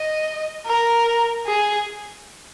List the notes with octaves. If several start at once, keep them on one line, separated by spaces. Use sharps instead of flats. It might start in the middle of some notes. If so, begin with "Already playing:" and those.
Already playing: D#5
A#4
G#4